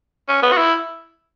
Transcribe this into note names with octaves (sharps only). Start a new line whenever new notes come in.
C#4
B3
F#4
E4